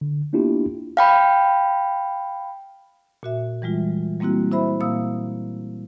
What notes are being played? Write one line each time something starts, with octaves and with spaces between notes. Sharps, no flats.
D3
A#3 B3 D4 E4 F4 G4
F5 G5 B5
A#2 F#4 E5
E3 G3 G#3 F4
G3 A#3 C4 E4 F#4
E4 C5 E5 B5
A#2 A#3 F5 D#6 E6